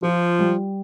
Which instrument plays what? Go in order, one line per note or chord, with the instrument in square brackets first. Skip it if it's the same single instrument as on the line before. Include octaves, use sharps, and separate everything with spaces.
[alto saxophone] F3 [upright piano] F4
[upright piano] G3